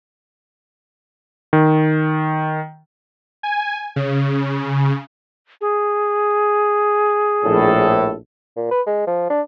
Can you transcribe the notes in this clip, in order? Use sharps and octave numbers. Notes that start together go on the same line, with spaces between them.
D#3
G#5
C#3
G#4
A#1 A2 A4
A#2
B4
G#3
F3
D4